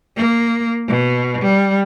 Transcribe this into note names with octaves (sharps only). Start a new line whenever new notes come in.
A#3
B2
G3